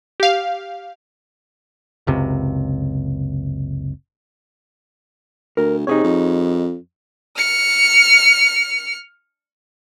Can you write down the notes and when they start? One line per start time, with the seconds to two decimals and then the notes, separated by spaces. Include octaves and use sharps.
0.20 G4 F5
2.07 F#1 C#2 C3
5.57 D2 A#4
5.87 C3 D#4 G#4 C#5
6.03 F2
7.37 F6 C#7